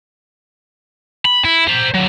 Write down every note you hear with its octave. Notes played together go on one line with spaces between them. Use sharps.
B5
E4
C5 A#5
D3 F#3